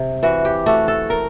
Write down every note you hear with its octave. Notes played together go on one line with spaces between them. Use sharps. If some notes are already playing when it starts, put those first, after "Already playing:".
Already playing: C3
E3 F#4
G4
A3 F#4
A4
A#4